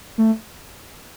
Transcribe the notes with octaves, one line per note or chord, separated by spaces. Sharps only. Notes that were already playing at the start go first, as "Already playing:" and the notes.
A3